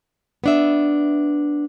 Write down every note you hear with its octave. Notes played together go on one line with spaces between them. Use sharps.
B3 D4 E5